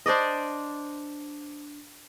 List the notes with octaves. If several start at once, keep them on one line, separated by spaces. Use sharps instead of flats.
D4 C5 D5 D#5